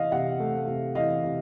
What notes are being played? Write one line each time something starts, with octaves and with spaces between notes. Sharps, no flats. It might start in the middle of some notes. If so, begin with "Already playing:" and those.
Already playing: C3 E3 D#5 F5
C3 E5 F#5
A3
C3
E3 D#5 F5
C3